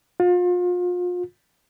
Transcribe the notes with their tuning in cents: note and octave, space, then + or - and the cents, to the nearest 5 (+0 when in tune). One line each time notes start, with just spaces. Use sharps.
F4 +35